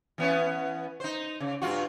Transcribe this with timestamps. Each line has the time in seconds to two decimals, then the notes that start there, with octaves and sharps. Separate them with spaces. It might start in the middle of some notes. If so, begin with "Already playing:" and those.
0.18 E3 B3 C#4
1.00 D#4 C5
1.40 C#3
1.62 G2 F4 F#4